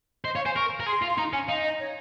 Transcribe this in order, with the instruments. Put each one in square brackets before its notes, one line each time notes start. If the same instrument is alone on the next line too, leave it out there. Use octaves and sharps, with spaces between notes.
[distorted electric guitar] C5 [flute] D#5
[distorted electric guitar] C#5 [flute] F5
[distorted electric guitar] C5 [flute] G#5
[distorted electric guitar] A#4 [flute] C#6
[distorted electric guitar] A#4
[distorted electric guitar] G#4 [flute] C6
[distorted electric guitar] F4
[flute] C6
[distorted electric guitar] D#4 [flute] A#5
[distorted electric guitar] C#4 [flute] G#5
[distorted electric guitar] D#4 [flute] F5
[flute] D#5
C#5